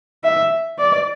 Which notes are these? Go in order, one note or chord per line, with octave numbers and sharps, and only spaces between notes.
E5
D5